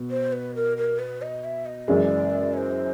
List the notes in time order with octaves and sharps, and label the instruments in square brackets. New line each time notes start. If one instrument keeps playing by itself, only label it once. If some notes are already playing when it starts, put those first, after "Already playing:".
Already playing: [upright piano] B2
[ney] C5
B4
A#4
A#4
B4
D#5
E5
D#5
[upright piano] F#2 C#3 E3 G#3 [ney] D5
[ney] C#5
C5